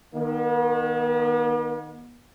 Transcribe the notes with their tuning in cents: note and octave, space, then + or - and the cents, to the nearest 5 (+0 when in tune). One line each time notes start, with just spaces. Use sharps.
D#3 -5 B3 -45